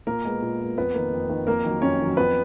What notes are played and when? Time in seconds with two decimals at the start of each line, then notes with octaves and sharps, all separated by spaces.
0.07 A#2 A#3 A#4
0.25 G#3 B3
0.42 A#2
0.60 G#3 B3
0.78 F2 B3 B4
0.94 D#3 A#3
1.12 F2
1.29 D#3 A#3
1.47 F2 A#3 A#4
1.65 D#3 F#3
1.82 F2 C#4 C#5
2.00 D#3 F#3
2.17 F2 B3 B4